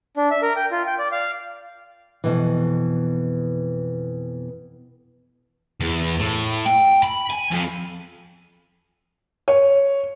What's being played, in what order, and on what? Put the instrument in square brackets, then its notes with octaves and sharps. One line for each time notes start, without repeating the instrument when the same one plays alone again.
[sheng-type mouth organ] D4
E5
A#4
G5
F4
G5
D5
F5
[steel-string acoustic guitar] F2 B2 E3
[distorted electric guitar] E2
A2
G5
B5
G#5
F2
[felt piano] C#5